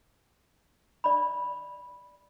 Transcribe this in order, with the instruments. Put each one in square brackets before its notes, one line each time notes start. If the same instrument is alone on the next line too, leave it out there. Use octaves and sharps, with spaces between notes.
[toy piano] D5 B5